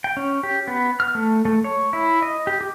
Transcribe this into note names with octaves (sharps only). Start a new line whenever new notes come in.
G5
C#4
G4
B3
F6
A3
A3
C#5
E4
D#5
G4
G4